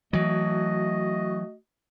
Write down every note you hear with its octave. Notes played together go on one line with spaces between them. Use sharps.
E3 F#3 A3 F#4 D#5